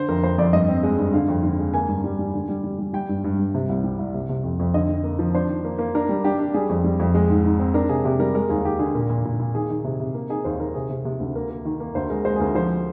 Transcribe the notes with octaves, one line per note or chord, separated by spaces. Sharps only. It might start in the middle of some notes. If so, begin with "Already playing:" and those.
Already playing: D3 C5
F2 A#4
F2 C5
F2 D5
G2 D#5
C4
G#3
G2
D3 F5
F2
D3
G#3
A#3 G#5
G2
G3
G3
D3
G3
G3
G3
G3 G5
G2
G2
G2
C3
C2
G3
C2
C3
C3
F2
F2
D3 D#5
D3
A#3
F3
D4 C5
D#3
A#3
A#3
D4 A#4
G3
D4 G4
D4
G3 G#4
F2
G3
F2
G#3
G#2
G#2
C4
D4 A#4
C3 G#4
C3 G4
G3 A#4
G#3 A#4
D#2 G#4
D#2 G4
D3 G#4
A#2 A#4
A#2
A#2
A#2
D#3 G#4
D#3
C3
C3
A#3
D#4 G#4
D#2 C5
D#3 A#4
C3 G#4
C3
C3
D2
A#3 A#4
A#3
D#3
A#3
D2 C5
G#3 A#4
G#3 C5
G#4
D2 A#4
F3 C5